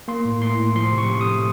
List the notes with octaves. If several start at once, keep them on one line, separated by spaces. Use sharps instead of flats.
A#3 C6
A2
A2 C6
A2
F3 C6
C3
C#6
C3
D#6
A3